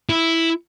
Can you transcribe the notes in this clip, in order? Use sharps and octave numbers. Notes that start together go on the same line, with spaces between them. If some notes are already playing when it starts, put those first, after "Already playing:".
E4